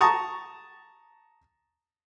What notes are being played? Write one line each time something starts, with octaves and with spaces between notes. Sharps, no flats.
A5 A#5 C#6 D#6